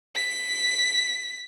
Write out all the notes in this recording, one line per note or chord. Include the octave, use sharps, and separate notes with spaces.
B6